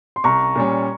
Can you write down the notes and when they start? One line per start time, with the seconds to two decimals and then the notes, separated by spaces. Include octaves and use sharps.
0.16 C6
0.24 C2 A#5 C#6
0.55 A#2 G3 C#4